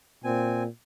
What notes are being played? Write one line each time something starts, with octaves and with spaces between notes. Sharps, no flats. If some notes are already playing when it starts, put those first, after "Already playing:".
A#2 C4 G#5